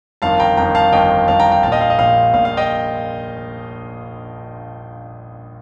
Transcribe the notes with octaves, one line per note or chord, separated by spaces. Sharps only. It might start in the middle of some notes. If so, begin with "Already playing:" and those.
G1 F2 D#3 F5 A5
G5 A#5
G1 F2 D#3 G5 A#5
F5 A5
G1 F2 D#3 D#5 G5
G1 F2 D#3 F5 A5
G5 A#5
G5 A#5
A#1 A#2 D#5 F5 G5 A5
F5
D#5
A#1 A#2 F5
A#1 A#2 F5
F5
D#5 G5